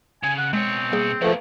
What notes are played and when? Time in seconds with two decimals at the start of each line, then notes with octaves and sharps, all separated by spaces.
0.23 C#3 G#5
0.38 F#5
0.53 B2 G#3 C4 C#5
0.92 G3 A#3 G#4
1.22 F3 A3 A#3 G#4 B4 F5